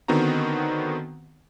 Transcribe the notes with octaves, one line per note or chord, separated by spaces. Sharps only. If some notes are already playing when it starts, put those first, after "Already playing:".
D3 D#3 B3 C4 F#4 A#5